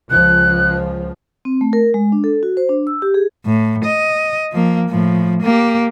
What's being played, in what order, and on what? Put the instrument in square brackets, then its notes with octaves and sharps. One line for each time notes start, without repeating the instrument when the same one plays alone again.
[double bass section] C#2 F3 [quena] F#6
[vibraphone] C4
A3
A#4
G#3
D4
A4
F#4
C5
D4
E6
G4
G#4
[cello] A2
D#5
F3 A#3
A2 F3
A#3 G4